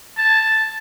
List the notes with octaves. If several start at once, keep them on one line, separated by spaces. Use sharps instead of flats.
A5